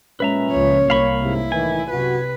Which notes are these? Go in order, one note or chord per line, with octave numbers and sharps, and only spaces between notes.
A#2 G#3 C#4 B4 E5 A#5
C#2 F3 C#5
C2 A#3 F5 B5 C#6
G#2 C3 E4
A2 D#3 E3 G#5
F#2 C3 F#4 B4